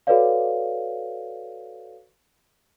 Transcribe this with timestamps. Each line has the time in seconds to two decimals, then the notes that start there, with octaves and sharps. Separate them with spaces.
0.07 F#4 A4 B4 C#5 D5 F5